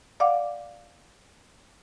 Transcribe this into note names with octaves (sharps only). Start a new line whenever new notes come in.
D5 F5 F#5 D6